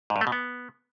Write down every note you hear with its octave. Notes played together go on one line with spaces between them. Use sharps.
G#2
G2
A3
B2
B3